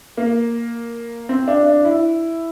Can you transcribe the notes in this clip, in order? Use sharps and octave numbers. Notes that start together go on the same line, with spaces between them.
A#3
C4
D4
D4
E4